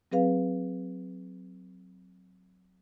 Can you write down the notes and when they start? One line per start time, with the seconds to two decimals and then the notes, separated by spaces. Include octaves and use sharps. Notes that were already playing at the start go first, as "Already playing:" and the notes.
0.12 F#3 C4 G#4 B4 F5